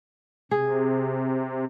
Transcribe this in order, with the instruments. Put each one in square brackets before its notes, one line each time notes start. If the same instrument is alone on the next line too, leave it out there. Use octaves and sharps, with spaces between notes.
[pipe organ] C3 [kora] G#4